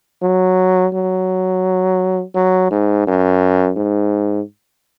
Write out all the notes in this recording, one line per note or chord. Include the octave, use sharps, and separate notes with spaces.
F#3
F#3
F#3
G#2
F#2
G#2